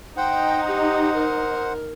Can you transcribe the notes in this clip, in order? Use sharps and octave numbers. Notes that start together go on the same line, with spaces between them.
D#4 C5 F#5 G5
G4
A#4